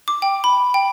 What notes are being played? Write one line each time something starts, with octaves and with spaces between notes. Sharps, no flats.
D6
G5
B5
G5